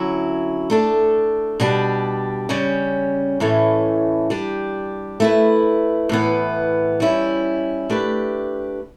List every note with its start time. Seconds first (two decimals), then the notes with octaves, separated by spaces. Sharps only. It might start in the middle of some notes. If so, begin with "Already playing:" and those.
Already playing: D3 F#3 C#4 E4
0.70 A3 D4 A4
1.60 B2 G3 D4 G4
2.49 C#3 G3 C#4
3.40 A2 E3 A3 C#4
4.30 G3 D4 G4
5.20 A3 E4 B4
6.09 A2 E3 B3
7.00 G3 C#4 E4
7.90 A3 D4 G4 B4